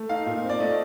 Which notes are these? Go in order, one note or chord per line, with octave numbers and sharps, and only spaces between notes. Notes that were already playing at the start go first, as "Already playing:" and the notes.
Already playing: A3
D#4 F5
A#2
C4
D5
A3 D#5